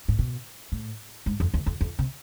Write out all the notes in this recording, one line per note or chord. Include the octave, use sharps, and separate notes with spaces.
A2
B2
A2
G#2
F2
E2
F2
F2
C3